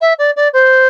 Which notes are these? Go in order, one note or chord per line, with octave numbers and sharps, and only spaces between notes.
E5
D5
D5
C5